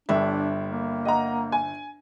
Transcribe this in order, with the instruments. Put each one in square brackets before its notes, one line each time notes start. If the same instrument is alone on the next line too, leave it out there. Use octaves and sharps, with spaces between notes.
[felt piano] G1 G2 E5 [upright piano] G3 [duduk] D4
[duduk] A#3
[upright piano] D#5 F#5 A#5
G#5